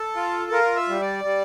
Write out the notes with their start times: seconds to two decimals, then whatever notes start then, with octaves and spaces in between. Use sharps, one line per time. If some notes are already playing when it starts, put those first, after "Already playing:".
Already playing: A4
0.16 F4
0.51 F4 A#4
0.76 E5
0.88 G3
1.01 D5
1.25 G3